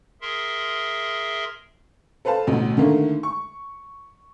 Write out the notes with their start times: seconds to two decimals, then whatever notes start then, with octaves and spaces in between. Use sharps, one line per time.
0.21 G#4 A#4 E5 C6
2.25 A4 B4 C5 F5 A5
2.47 A1 D2 B2
2.77 D3 D#3 A3 A#3
3.23 C#6